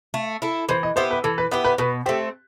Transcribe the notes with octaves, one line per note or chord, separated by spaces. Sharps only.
A3
E4 A4
E3 C5
D#5
B3 E4 G4 C5
B4
E3 A4
B4
B3 E4 G4 B4
B4
B2 B4
A3 C4 G4